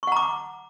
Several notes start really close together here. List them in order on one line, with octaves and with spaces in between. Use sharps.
C#6 F#5 A#5 D6